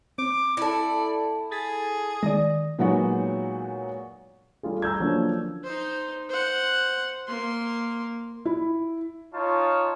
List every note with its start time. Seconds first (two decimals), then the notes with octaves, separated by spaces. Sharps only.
0.18 C4 D6
0.57 E4 A4 D5
1.51 G#4 G#6 A6 B6
2.23 D#3 G#3 D5 D#6 A#6
2.78 A#2 F#3 G#3 B3 D#4 F#4
4.63 G3 A3 F4 G#4
4.82 A#5 E6 G6 G#6
5.00 D3 F3 F#3 A#3 C#4 D4
5.64 D#4 C5
6.29 C5 F#5
7.27 A#3 C6
8.45 E4
9.33 D#4 F4 C#5 A5